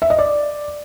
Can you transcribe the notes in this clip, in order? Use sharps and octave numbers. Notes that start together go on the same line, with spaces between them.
E5
D#5
D5